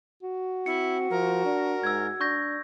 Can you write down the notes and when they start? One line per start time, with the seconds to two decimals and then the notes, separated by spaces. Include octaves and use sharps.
0.23 F#4
0.66 C4 E4 C#7
1.10 F3 A#4
1.45 D4
1.83 G#2 E6 G#6
2.21 D4 C#6 G6 A#6